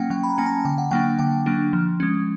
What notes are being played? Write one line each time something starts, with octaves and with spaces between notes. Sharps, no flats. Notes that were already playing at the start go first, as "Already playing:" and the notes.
Already playing: F#3 A#3 C#4 F#5 G5
F#3 G5
B5
A#5
A#3 C#4 G#5
A5
D3 G5
F#5
F#3 A#3 D4 G5
D3 G5
F#3 A#3 D4
F3
G#3 C#4